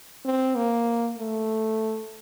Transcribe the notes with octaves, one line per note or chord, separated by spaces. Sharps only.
C4
A#3
A3